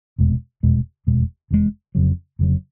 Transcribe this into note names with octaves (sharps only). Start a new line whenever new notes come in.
F1 E2 B2 G#3
F1 E2 B2 G#3
F1 E2 B2 G#3
F1 E2 B2 G#3
F1 F2 C#3 F#3
F1 F2 C#3 F#3